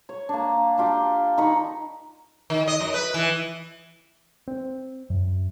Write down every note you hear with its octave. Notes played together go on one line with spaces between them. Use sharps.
C#5
A#3 D4
D4 F4 G4
D#3 D#4 B5 C#6
D#3
D#5
F#2
B4
E3
C4
F#2